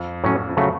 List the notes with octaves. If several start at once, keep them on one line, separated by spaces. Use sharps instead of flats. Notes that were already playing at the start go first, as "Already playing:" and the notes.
Already playing: F2
A2 F#3 C#4
F2
C#3 F#3 A3